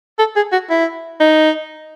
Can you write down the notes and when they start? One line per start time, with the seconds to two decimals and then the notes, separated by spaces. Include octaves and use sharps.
0.19 A4
0.36 G#4
0.52 F#4
0.70 E4
1.20 D#4